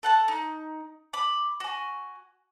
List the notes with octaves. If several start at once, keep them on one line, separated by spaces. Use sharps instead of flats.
A4 F#5 A5
D#4
B5 D6
F#4 G#5